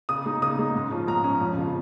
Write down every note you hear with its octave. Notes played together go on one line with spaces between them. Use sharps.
C#3 D#6
G#3 D#4
C#3 D#6
G#3 D#4
G#2
F3 C#4
G#2 A#5
F3 C#4
F2
C#3 F3